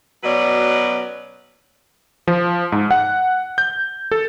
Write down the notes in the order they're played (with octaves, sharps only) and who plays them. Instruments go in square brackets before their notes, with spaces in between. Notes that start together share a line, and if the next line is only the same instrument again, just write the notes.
[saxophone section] B2 F#3 C#4 B4 D5 D#5
[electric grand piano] F3
G#2
F#5
G6
A4